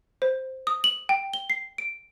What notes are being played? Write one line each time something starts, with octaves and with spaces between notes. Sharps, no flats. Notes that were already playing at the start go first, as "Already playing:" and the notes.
C5
D#6
F#7
G5
G7
C7
D7